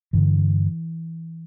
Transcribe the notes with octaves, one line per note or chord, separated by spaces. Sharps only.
G2 D3 E3